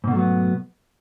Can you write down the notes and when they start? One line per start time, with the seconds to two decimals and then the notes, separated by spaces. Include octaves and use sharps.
0.04 G#2
0.07 B2
0.11 A3
0.15 F#3
0.19 B3